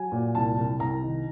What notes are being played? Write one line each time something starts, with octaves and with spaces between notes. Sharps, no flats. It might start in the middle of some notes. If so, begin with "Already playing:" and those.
Already playing: F#3 G#5
A#2
C2 A5
C2
C2 A#5
D#3